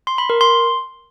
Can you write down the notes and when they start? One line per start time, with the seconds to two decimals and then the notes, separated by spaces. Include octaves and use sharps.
0.07 C6
0.18 B5
0.30 A#4
0.41 C6